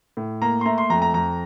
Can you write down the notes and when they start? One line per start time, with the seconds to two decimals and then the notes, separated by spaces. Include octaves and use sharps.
0.17 A2
0.42 A#3 A#5
0.61 C6
0.66 A3 A#5
0.78 C6
0.90 F2 A#5
1.02 A#5
1.14 F2 A#5